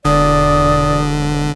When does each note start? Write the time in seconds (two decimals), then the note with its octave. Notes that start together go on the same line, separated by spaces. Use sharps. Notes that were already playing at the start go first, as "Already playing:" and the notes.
0.05 E1 D3 D5 D#6